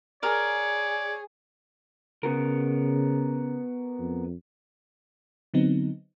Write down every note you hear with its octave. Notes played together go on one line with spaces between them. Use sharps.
G#4 A#4 C#5 D5
C#3 B3 F#4 A#4
F2
D3 F#3 B3 C4 D#4